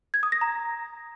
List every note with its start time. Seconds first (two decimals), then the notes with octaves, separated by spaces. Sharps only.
0.14 G#6
0.23 D#6
0.32 A#6
0.41 A#5